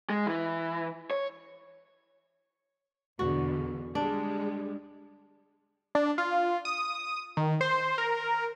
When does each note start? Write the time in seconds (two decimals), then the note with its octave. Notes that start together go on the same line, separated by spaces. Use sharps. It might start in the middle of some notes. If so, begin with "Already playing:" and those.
0.10 G#3
0.27 E3
1.11 C#5
3.19 E2 B2 D3 F#4
3.95 G3 G#3 D4
5.95 D4
6.18 F4
6.65 D#6
7.37 D#3
7.61 C5
7.98 A#4